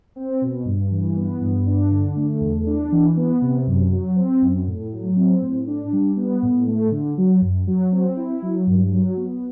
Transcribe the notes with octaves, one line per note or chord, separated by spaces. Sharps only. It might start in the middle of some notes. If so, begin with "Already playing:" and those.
C4
B2
G2
E3
B3
G2
D4
D3
A3
E2
D4
E3
B3
C3
F#2
F#3
C4
F#2
A2
F#3
C4
A2
D4
G3
B3
A2
A3
D3
F#3
F#2
F#3
C4
E4
F#3
G2
F#3
B3